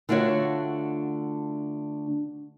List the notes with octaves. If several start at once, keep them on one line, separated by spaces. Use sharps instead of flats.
D3 A3 D4 F4 F#4 C#5